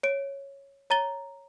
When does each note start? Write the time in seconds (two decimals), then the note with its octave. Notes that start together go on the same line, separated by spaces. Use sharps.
0.03 C#5 D7
0.90 C#5 A#5 A6 G7